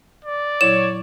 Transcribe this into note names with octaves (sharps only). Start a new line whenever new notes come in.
D5
A#2 F#3 E4 C#5 E7